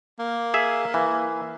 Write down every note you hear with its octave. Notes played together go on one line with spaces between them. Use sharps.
A#3
G#4 E5
E3